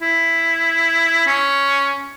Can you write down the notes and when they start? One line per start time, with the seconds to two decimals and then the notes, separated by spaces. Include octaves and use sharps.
0.02 E4
1.27 C#4